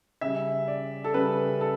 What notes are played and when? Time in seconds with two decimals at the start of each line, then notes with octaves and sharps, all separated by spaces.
0.21 C#3 G3 E5
0.68 D5
1.04 A4
1.14 C#3 G3 B4
1.61 A4